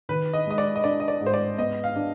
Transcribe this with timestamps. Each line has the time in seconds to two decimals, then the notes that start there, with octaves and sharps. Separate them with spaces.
0.09 D#3 B4
0.33 D#5
0.46 G#3 D#5
0.58 D5
0.76 D#5
0.84 D4 D5
1.00 D#5
1.08 D5
1.21 G#2
1.26 C5
1.34 D5
1.58 B3 D#5
1.84 F5
1.96 D4